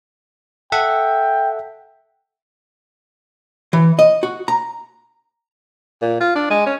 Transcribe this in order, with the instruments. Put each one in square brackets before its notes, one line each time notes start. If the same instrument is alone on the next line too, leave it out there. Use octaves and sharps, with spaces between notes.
[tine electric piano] A4 E5 F#5 [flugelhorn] G5
[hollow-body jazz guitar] E3
D#5
F#4
A#5
[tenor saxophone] A#2
F4
D4
G#3
C#4